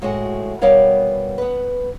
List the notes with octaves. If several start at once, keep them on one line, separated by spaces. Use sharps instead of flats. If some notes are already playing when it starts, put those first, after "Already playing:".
A2 G#3 A3 F#4
B2 G3 B3 A#4 C#5 F5
B3 B4